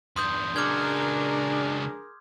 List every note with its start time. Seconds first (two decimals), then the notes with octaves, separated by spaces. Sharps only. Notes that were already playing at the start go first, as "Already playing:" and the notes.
0.16 E2 G2 C6 D#6 G6
0.56 C#2 F#3 D4 G#4 A#4 D6 F6 G#6